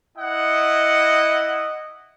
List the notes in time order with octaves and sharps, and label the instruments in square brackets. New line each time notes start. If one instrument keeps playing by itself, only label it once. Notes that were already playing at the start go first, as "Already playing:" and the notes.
[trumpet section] E4 D#5 F#5